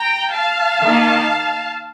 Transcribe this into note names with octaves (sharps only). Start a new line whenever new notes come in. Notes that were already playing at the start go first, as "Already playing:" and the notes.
Already playing: G5 A#5
F5 A5
D#3 A#3 D#4